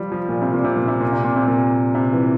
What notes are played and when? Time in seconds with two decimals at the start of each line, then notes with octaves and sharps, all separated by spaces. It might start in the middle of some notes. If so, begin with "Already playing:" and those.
Already playing: F3 G3
0.12 F3
0.29 A#2
0.42 C3
0.53 A#2
0.65 C3
0.77 A#2
0.88 C3
1.01 A#2
1.13 C3
1.24 A#2
1.36 C3
1.48 A#2
1.95 C3
2.13 E3